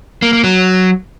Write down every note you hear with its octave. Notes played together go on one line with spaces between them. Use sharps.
A#3
A#3
F#3